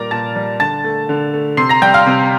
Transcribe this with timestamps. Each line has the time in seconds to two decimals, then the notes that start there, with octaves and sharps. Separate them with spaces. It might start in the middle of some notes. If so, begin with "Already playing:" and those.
Already playing: A#2 G3 A#4 D5 A#5
0.11 A#2 A5 A6
0.36 G3
0.60 D3 A5 A6
0.84 A3
1.09 D3
1.34 A3
1.57 C3 C6 C7
1.69 A#5 A#6
1.82 G3 G5 G6
1.94 F5 F6
2.06 C3